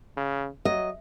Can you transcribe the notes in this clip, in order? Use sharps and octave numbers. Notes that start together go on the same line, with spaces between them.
C#3
F#3 D#5